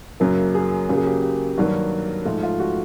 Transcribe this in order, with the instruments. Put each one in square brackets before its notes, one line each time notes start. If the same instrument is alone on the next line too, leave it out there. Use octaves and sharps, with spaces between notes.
[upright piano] F#2 C#3 F#3 A#3
G#4
C#3 F#3 A#3 G4
G#4
G4
G4
G2 D#3 F#3 A#3 F#4
G#2 F3 A3 F4
F4
F#4